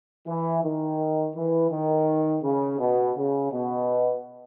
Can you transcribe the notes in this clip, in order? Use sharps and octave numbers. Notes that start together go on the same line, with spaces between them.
E3
D#3
E3
D#3
C#3
B2
C#3
B2